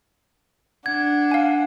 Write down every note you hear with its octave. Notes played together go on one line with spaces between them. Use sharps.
D4 F#5 G#6
F5 G#5